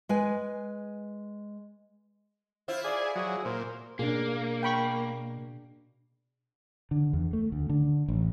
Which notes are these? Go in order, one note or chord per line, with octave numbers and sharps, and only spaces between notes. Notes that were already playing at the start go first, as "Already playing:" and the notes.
G#3 B4 G#5
E4 F4 C5
G#4 D5
F#3 G#4
A#2 C5
B2 A#3 D4 G#4
G5 B5 C#6
D3
E2
A3
D2
D3
A1